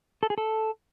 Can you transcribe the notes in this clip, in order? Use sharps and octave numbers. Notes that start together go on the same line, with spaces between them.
A4
G#4
A4